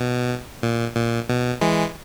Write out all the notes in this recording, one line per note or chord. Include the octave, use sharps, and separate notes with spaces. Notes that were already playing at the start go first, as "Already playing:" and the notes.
Already playing: B2
A#2
A#2
B2
E3 G#3